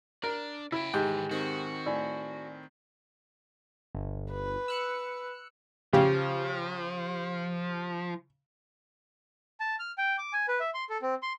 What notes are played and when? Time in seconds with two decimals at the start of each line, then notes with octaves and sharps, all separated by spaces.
0.24 D4 A#4
0.72 C#3 E4 G5
0.94 G#2 D#3 E3 G4 G5 G6
1.31 D#3 C4 F#4
1.86 A2 D5 G#5
3.95 G1
4.32 B4
4.68 E6 F#6 C#7
5.93 C#3 F3 G4
9.60 A5
9.79 F6
9.98 G5
10.18 D6
10.33 G#5
10.48 B4
10.60 E5
10.74 C6
10.89 A4
11.02 C4
11.22 C6